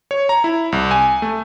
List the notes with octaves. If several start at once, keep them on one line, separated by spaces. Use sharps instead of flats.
C#5
A#5
E4
C2
G#5
A3